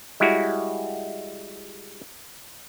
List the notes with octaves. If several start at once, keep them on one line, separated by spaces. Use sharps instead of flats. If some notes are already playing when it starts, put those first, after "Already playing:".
G3 G#3 E4 F#4